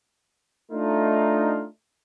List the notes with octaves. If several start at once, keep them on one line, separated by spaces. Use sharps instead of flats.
A3 D4 D#4 F4